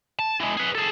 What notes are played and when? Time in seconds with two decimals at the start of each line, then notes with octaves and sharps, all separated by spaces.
0.19 A5
0.40 E3 G#3
0.57 G#4 B4
0.75 G#4 A4